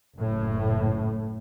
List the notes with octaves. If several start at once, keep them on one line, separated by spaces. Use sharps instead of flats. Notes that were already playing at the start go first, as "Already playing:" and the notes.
F#1 A2